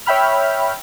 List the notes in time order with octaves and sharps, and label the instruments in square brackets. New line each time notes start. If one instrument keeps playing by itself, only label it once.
[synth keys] C#5 E5 G5 B5 F6